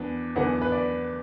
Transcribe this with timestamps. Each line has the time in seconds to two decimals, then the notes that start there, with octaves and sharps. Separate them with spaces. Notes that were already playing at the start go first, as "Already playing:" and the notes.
Already playing: E2 E3 B3 D4
0.36 E2 E3 B3 D4 F#5
0.62 B4
0.72 D5